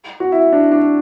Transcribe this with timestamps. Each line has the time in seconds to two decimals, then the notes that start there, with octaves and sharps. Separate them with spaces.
0.20 F#4
0.32 E4
0.53 D4
0.72 D4